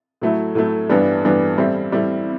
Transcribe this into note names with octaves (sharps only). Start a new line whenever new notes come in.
A2 F#3 A3 E4
A2 F#3 A3 E4
G2 E3 G3 B3 D4
G2 E3 G3 B3 D4
A2 G3 C4 E4
A2 G3 C4 E4